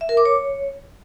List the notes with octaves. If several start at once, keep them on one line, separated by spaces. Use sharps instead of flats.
E5
A#4
D6
C#5